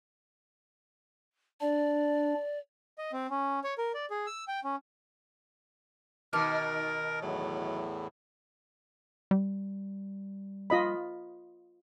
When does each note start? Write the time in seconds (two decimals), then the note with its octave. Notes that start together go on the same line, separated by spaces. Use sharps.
1.61 D4 D5
2.98 D#5
3.12 C4
3.30 C#4
3.64 C#5
3.78 A#4
3.94 D5
4.10 G#4
4.26 E6
4.48 G5
4.64 C#4
6.33 B2 D#3 A#4 A5 D6 F6
7.22 E2 A2 F#3
9.31 G3
10.70 F4 D#5 B5